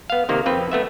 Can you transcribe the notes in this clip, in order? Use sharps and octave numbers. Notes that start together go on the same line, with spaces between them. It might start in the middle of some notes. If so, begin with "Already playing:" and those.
B3 F5
C3 D#3 A#3
F2 C4 B4
A3 B3 E5